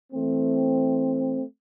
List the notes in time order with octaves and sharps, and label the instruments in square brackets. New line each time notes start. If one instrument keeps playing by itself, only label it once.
[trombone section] E3 A3 C4